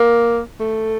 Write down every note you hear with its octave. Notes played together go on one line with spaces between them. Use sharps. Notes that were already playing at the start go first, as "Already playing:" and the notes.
Already playing: A#3
A3